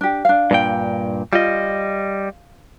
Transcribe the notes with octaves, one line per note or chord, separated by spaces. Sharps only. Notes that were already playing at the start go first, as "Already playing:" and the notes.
D4 G4
D4 F5
G2 A#2 G5
G3 F4 D#5